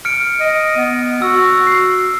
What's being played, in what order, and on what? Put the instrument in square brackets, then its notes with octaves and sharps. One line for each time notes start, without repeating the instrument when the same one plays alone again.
[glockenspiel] F6 C#7 D7
[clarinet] D#5
B3
[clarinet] F#4 [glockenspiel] E6
[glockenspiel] C7